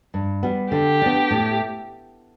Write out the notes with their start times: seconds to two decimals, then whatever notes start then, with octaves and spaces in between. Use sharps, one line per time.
0.14 G2
0.43 G3 B3
0.72 D3 G4
1.02 B3 D4
1.31 A2